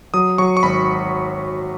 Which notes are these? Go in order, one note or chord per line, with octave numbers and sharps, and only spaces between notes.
F#3 D#6
F#3 C#6
C#6
G#1 B5